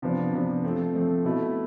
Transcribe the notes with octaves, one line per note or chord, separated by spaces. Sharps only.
C3 F3 B3 D4
C3 F3 B3 D4
F3 A3 C4
F3 A3 C4
B2 A3 E4